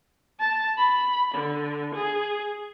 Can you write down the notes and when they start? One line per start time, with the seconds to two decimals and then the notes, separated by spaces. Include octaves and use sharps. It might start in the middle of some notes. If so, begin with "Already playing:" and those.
0.40 A5
0.78 B5
1.35 D3
1.95 G#4